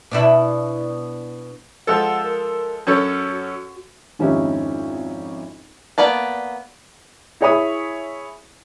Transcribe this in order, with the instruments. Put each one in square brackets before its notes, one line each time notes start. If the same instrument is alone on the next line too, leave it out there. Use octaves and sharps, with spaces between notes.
[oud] B2 D4 E4
[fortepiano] F3 G#3 A4 [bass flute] F#5
[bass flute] A#4
[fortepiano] F#2 C#4 A4 [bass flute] F#4
[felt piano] G#1 F2 C#4 D#4 E4 G4
[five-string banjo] A#3 B3 D5 A5
[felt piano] E4 G#4 C#5 G#5 B5 D#6